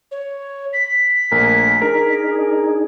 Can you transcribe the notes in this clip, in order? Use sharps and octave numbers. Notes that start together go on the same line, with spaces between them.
C#5
B6
A#1 A3 A#4 G#5
D4 D#4 G#4 A#4